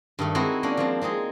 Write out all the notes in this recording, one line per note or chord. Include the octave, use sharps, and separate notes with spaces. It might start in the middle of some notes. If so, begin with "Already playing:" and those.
G2 D#3 A3
G#3 C4 D#4 E4 F#4
A#3 C#4 D4
F3 G#3 C4
G#3 C4 D#4 G#4